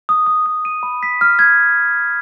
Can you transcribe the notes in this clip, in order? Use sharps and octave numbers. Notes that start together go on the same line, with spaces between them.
D#6
D#6
D#6
D#7
B5
B6
F6
G#6